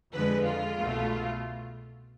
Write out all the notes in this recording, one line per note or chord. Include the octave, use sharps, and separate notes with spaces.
F2 D3 G#3 B4
F4
C2 B2 A3